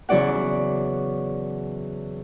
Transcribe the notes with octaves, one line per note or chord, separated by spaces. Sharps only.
E2 C#3 F#3 E4 D5 F#5